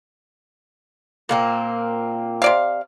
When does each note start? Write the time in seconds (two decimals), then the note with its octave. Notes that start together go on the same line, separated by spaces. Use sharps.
1.29 A#2 A#3 C4
2.42 C3 D5 F5